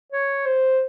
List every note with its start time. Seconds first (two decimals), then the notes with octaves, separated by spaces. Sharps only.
0.12 C#5
0.46 C5